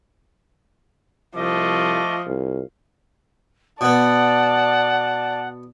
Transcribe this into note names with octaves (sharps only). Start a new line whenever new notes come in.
C2 F3 A3 D#5 D6
C2
B2 B3 D5 F#5 A5